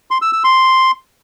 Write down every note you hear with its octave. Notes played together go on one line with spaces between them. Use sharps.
C6
E6
E6
C6